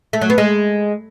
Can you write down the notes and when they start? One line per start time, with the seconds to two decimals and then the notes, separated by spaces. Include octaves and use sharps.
0.13 A3
0.21 F#3
0.30 B3
0.38 G#3